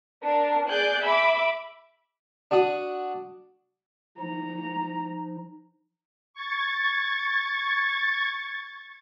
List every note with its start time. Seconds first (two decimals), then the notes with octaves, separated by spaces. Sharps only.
0.24 D4 A#4
0.68 G#4 D5 F#6 G6
1.05 E5 B5 D6
2.51 D4 F#4 D#6
4.19 F3 D#4 A#5
6.34 C#6 G#6 A6